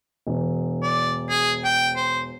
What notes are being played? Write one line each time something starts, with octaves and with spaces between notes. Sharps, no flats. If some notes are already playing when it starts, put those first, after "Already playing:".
E1
D5
G#4
G5
C5